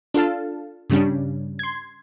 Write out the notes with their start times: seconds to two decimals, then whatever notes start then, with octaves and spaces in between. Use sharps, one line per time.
0.14 D4 F4 A4 F5 A5
0.90 G2 C#3 G3 C#4 D4
1.59 C6 G#6